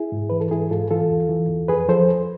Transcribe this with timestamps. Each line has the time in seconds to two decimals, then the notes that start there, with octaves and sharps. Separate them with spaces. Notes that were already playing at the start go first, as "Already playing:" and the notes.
Already playing: E4 G#4
0.12 G#2
0.30 E3 B4
0.41 A4
0.51 G#2 E4 G#4
0.71 G#2 F4 A4
0.91 E3 F4 A4
1.10 E2
1.29 E3
1.49 E2
1.68 F2 G#4 B4
1.88 F3 A4 C5